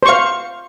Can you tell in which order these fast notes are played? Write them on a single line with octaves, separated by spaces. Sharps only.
C5 C#6 F5